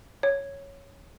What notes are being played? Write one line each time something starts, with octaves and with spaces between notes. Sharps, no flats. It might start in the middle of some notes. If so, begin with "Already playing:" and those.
C#5